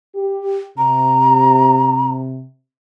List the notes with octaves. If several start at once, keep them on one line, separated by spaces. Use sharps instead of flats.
G4
C3 A#5